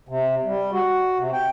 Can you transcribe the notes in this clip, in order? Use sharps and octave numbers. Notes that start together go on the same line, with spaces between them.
C3
G3
F#4
C3
G5